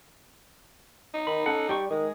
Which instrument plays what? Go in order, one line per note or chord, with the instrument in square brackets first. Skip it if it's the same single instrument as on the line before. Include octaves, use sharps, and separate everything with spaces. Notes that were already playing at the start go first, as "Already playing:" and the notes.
[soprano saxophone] D#4
[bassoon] D#3 [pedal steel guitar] B5
[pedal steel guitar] C#4 F#5 [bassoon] A4
[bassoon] G3 [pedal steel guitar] G4 D5 C#6
[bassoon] D#3 [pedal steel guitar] G#3 G#4